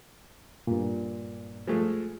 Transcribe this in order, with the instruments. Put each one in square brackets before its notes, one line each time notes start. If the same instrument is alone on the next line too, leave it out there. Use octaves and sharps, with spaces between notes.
[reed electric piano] G2 A#2
[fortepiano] F3 G#3 A3